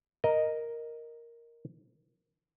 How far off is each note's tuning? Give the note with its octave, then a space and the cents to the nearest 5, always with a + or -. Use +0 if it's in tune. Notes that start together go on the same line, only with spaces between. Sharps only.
A#4 +0 D#5 +0